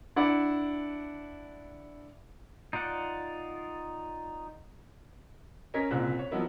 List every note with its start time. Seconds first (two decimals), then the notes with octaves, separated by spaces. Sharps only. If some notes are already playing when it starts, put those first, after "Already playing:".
0.16 D4 E4 D5 F#5
2.73 D#4 F4 D5 F#5
5.74 C#4 A#4 D#5 G#6 B6
5.91 F#1 C2 A#2 C4 G#4 F#6
6.19 C#5
6.31 F3 F#3 B3 D#4 E4 A#4